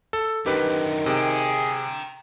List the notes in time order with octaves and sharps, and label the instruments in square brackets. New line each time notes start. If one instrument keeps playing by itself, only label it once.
[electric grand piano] A4
[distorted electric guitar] F#2 D3 [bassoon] D#3 [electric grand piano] G4 B4
[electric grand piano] C3 [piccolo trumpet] G#4 [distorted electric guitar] G5 A#5